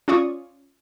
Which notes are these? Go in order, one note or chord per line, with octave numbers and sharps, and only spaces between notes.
C#4 F4 D5 C#6 D#6